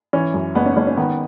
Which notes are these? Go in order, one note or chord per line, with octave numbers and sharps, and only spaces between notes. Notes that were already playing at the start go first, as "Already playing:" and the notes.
E3 C#4
F#2
F#1 B3
C#4
F#1 C#4
C#4
D#3 B3